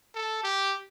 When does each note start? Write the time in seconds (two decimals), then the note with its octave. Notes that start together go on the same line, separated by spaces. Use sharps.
0.15 A4
0.44 G4